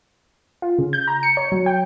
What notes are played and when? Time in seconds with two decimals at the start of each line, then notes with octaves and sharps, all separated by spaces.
0.62 F4
0.78 C#3
0.93 G6
1.07 A#5
1.23 C#7
1.37 C#5
1.52 F#3
1.66 G5